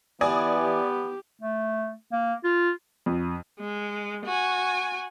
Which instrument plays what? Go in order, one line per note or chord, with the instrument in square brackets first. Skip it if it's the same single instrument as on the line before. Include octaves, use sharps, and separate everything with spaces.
[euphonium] E3 [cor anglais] B3 [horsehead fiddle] G4 [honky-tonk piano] D5 G#5 D#6
[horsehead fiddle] G4
[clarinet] A3
A#3
F4
[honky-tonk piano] F2
[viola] G#3
F#4 G#5